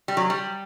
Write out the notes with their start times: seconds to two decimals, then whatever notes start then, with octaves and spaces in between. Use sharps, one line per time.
0.08 G3
0.17 F#3
0.30 G3